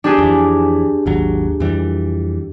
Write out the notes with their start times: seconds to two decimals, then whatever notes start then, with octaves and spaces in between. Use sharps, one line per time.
0.04 D4 G4 G#4
0.18 F2 E3
1.06 G#1 D#2 F#3
1.60 F2 E3 G3